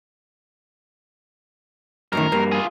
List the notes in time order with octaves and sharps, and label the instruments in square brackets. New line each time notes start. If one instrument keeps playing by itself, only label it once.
[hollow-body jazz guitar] F#2 A2 D#3 [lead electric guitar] A#4
[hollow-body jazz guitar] G2 A#3
[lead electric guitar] F4 G#4